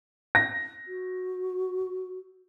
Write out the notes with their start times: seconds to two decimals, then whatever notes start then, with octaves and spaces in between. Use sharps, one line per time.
0.35 A#6
0.87 F#4